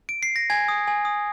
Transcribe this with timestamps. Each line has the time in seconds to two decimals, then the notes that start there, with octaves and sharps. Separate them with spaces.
0.09 D7
0.23 C7
0.36 A#6
0.50 G#5 G#6
0.68 D#6
0.87 G#5
1.05 D#6